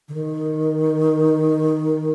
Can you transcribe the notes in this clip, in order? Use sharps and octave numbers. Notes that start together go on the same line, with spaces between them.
D3
D#3